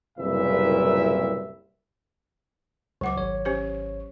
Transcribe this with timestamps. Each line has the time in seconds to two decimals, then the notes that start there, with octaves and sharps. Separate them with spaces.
0.18 F#1 C2 A#2 B4 E5
3.01 C#2 F#3 F#5 D6
3.17 G#1 C#5
3.45 C#4 G4 C5